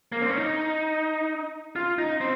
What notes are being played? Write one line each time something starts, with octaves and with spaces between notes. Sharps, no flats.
A#3
C4
C#4
D#4
F4
D#4
C4